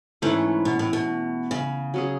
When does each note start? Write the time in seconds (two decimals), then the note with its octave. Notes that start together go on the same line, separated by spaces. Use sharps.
0.22 G#2 E3 A3 C#4 E4
0.65 B2
0.79 A2
0.93 B2
1.51 C#3
1.94 F#3 C#4 G#4